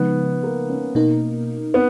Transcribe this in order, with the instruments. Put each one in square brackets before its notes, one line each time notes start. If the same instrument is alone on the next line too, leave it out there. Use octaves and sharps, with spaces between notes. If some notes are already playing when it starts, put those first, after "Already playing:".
Already playing: [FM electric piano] C#3 F3 G#3 D#4 [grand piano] B3
[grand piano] A#3
C#4
[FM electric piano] B2 A#3 D#4 A#4
[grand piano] B3